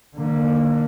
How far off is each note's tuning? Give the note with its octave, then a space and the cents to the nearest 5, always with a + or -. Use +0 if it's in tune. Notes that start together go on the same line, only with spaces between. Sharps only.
D3 +30 A#3 +0